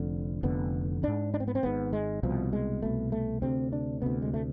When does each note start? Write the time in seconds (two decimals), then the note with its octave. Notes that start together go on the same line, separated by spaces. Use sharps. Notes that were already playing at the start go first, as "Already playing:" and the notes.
Already playing: F1 F2 D3
0.43 F1 F2 D3 B3
1.03 G#1 G#2 D4
1.34 D4
1.40 C4
1.48 B3
1.55 C4
1.63 G#1 G#2 B3
1.93 G#3
2.23 C2 B2 F3
2.53 G#3
2.82 C2 B2 A3
3.12 A3
3.42 D2 C3 C4
3.73 D4
4.02 D2 C3 B3
4.22 G#3
4.34 A3